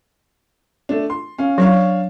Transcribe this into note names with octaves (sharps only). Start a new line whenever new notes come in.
A3 D4
C6
C#4 F5
F#3 D4 C#5 F5